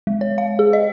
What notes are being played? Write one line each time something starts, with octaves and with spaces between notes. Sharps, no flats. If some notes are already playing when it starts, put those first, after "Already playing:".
G#3
C#5
F5
G#4
D#5